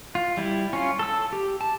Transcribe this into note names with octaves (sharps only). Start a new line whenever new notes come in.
F4
G3 E4
C#4 F4
A4 E6
G4
A5